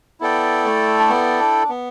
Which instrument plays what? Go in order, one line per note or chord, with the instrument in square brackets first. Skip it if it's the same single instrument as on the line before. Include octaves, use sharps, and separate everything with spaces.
[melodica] B3 [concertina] E4 A4 D5 G5
[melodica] A3
D4
B3
D4
B3